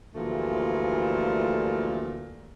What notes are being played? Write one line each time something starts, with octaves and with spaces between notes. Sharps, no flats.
D2 A#2 E3 F3 G3 A3